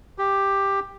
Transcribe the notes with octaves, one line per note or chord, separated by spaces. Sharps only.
G4